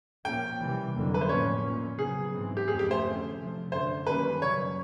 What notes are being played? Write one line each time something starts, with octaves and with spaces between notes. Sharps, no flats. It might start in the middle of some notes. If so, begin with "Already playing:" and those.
A#2 F3 A#3 C#4 G5
C3 E3 G3
F2 D3 F#3 A#3
B4
C5
A2 F3 A#3 C#4 C#5
A#2 F3 A#3 C#4
C#3 F#3 B3 G#4
G#2 E3 G#3 C4
G4
F2 C#3 F3 A3 C4 G#4
G4
C5
F2 D3 F3 A3 C#4
C3 F3 A3
F#2 D3 F#3 C5
F#2 D#3 G3 A#3 C#4 B4
F#2 C#3 F#3 C#5